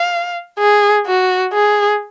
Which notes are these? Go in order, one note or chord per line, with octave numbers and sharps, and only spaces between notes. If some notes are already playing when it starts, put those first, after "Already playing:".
Already playing: F5
G#4
F#4
G#4